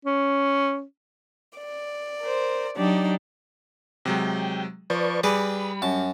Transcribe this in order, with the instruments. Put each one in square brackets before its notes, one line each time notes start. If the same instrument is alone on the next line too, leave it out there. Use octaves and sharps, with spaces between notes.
[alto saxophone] C#4
[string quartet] D5
[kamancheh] A#4 C5
[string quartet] F#3 D4 D#4 [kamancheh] G4 D5
[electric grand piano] C3 F#3 G#3 [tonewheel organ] G5
[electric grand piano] F3 [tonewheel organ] B4 D5 C#6
[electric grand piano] G3 [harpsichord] G#4 B4 D5 [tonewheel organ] B5
[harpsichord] F#2 A5